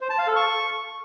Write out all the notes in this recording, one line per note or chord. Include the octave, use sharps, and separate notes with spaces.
C5
A5
F5
A4
C#6